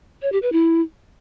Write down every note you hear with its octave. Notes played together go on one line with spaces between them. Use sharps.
C#5
G4
B4
E4